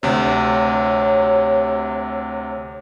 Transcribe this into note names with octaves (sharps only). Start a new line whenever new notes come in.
D2 C3 C#5